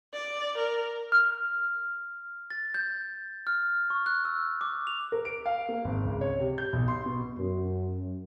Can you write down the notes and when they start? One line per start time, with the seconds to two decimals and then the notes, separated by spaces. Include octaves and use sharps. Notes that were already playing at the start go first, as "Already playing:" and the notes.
0.13 D5
0.58 A#4
1.12 F6
2.50 A6
2.74 G6
3.47 F6
3.90 C#6
4.06 F#6
4.25 E6
4.61 D6
4.87 F7
5.12 A#4
5.25 D7
5.46 F5
5.69 A#3
5.84 G#1
6.05 C#2
6.21 C#5
6.39 C3
6.58 G6
6.73 B1
6.88 C6
7.06 B2
7.38 F#2